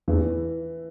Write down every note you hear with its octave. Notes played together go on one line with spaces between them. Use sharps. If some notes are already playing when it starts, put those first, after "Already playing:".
E2 E3